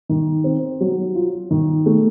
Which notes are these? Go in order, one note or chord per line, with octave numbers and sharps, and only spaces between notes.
D#3
C4
F#3
F4
D#3
A3